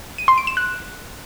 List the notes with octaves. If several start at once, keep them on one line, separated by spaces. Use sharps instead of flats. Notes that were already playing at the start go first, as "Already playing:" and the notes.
D#7
C6
D7
E7
F#6